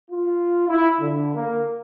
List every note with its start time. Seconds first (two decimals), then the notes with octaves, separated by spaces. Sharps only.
0.10 F4
0.69 E4
0.99 D3
1.34 A#3